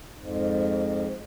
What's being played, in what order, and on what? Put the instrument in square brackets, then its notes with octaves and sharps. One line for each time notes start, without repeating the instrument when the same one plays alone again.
[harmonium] F2 G#2